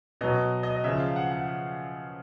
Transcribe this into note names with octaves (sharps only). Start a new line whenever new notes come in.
B2 F#3 D#5
D#5
D#5
C#3 F3 E5
F5
F#5
F#5